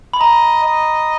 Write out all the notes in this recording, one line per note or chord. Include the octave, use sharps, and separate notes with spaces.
B5
D#5 A#5
D#5